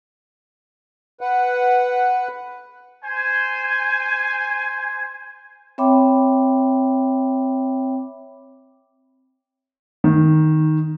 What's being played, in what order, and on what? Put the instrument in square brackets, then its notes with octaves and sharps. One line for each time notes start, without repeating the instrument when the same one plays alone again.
[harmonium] B4 F#5
[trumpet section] C5 G#5
[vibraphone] C4 C#5 E5 G5 B5 D6
[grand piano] D#3